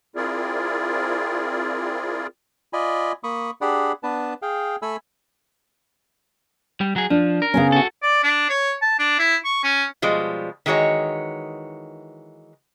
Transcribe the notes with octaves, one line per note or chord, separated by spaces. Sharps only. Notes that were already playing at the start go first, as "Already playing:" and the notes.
C4 E4 F4 G#4 A#4 D5
F4 D5 D#5 G#5 B5
A#3 B5 C#6 D#6
D4 G4 G#4 D5 F#5 B5
B3 D4 B4 A5
G#4 F5 G5
A3 A4 G#5 B5 E6
G3
F#3 G#4
F3 D4
A#4
C#3 B3 C#4
F#4 A4
D5
D4
C#5
A5
D4
E4
C#6
C#4
B2 F3 G3 G#3
D#3 E3 G#3 F#4 C#5